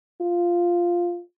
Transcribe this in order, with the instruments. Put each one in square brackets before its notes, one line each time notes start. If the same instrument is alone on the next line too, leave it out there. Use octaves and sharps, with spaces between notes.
[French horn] F4